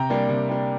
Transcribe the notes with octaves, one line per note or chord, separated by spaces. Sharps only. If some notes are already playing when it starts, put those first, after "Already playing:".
Already playing: C3 G5 A#5
G3 A#3 D4
C3
G3 A#3 D4